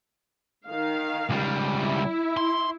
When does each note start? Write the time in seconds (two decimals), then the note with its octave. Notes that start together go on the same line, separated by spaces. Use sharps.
0.67 D#3 F5
1.30 C#2 G3
1.79 E4
2.37 C6